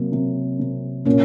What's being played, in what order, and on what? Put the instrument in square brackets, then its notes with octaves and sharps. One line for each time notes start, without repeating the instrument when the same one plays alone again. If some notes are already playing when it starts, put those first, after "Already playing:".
Already playing: [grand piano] C3 [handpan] F#3 A#3
[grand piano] C3
C3
[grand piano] A#2 [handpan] A#3 C#4